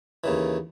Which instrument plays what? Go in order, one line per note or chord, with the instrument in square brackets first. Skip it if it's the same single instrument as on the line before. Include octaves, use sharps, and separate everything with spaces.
[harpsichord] D#2 C#3 E3